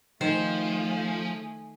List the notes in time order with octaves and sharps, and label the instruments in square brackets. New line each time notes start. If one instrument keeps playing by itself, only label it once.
[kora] D#3 [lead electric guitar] F3 [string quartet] A3 G#4 [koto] C5